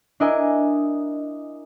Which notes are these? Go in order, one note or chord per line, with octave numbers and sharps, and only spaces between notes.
D4 E4 A#4 D#5 E5 G#5